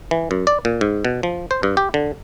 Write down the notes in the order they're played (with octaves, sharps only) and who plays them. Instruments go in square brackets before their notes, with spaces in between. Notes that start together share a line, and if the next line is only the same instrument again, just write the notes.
[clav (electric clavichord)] E3
F#2
D5
A#2
G#2
B2
F3
C5
G2
G4
D3